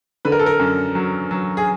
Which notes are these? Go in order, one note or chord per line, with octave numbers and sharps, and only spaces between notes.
D3 B4
A#4
A4
A#4
F#2
F#3
F#3
G#4